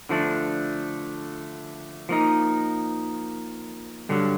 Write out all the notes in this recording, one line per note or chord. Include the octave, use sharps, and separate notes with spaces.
D3 F3 A3 D4
F3 A#3 D#4
G2 D3 F#3